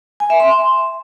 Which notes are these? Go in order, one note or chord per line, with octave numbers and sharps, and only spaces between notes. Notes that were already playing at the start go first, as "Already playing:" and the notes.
G#5
E5
C6